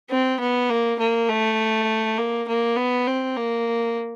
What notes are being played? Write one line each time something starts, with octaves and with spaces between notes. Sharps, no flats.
C4
B3
A#3
A#3
A3
A#3
A#3
B3
C4
A#3